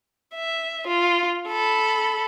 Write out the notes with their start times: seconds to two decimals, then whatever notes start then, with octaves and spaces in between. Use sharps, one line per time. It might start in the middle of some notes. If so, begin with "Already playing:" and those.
0.35 E5
0.87 F4
1.48 A4 B5